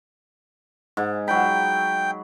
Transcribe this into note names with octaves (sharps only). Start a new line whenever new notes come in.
G#2
F#3 G5 B5